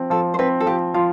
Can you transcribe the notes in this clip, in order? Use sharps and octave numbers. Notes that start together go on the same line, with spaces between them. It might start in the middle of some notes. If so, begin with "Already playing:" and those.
Already playing: F3 C4
F3 A4
C5
C4 B4
A4
F3 G4
F3 F4